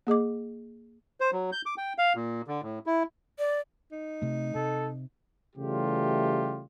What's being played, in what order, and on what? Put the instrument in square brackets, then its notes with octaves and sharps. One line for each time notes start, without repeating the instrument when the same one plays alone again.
[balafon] A#3 G#4 D#5 D6
[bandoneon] C5
F#3
G6
D6
G5
F5
A#2
D3
A2
E4
[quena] D5
[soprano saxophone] D#4
[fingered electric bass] C3 A3
[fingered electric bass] C3 [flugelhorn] A4
[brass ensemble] C#3 E3 G3 A3 F4 G4